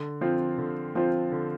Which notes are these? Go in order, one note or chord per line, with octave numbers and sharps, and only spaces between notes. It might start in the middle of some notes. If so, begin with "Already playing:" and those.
Already playing: D3
F3 C4 F4 C5
D3
F3 C4 F4 C5
D3